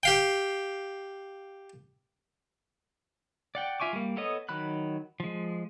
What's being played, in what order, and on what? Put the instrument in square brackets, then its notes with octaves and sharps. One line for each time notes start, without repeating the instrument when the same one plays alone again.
[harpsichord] G4 F5 G5
[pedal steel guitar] D5 F#5 G5
F4 E5 G#5 C#6 D6
G3 A#3
B3 A4 C#5 D#5 D#6
D#3 F#3 B5 F#6
F3 G#3